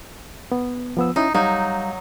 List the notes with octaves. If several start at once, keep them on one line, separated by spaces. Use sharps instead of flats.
B3
F3 B3 E6
C#4 D#4 E4
F#3 G3 D#4 F5 G6